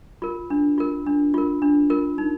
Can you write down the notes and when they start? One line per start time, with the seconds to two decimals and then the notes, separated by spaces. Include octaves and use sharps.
0.22 F4 A#4
0.50 D4
0.78 F4 A#4
1.06 D4
1.34 F4 A#4
1.62 D4
1.90 F4 A#4
2.18 D#4